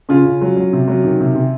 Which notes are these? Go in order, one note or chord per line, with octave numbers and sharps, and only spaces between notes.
C#3 C#4 F4
C#3
F#3
F#3
C3
F#3
D#3
C3
C3